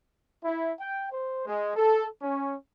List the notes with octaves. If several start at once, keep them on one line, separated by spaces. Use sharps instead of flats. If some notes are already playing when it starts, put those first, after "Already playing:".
E4
G5
C5
G#3
A4
C#4